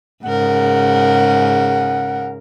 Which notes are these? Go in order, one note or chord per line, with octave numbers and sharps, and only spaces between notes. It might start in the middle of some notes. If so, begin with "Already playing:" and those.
G#2 C#3 A#4 F#5